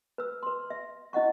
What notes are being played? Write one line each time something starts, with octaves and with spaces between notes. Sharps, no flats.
B4 E6
B4 C6
E5
C#4 E4 D#5 F#5 C#6